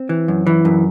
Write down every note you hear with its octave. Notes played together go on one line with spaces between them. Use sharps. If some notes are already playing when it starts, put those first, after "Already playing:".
Already playing: C4
E3
F#2
E3
F#2